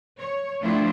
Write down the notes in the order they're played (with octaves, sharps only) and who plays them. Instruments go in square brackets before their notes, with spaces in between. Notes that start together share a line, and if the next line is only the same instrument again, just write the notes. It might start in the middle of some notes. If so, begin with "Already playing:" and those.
[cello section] C#5
F3 A3 C4 D4 E4 F4